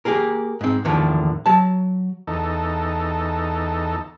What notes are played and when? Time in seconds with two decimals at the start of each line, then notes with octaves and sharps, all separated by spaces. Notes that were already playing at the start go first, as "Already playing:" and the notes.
0.05 A#3 G4 G#4 A#4
0.61 G#2 C4
0.85 E2 A2 D3 D#3 F3 A#3
1.46 F#3 A5
2.27 E2 D#4 A4